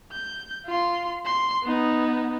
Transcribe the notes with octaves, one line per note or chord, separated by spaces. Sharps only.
G6
F4 C6
C6
B3 D#4